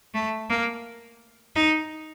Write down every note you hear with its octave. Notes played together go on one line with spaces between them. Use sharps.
A3
A#3
D#4